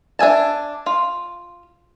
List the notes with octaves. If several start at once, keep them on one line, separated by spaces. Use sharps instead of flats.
D4 E5 G#5 A5
F4